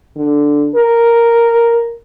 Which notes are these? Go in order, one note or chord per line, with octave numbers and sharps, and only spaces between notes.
D3
A#4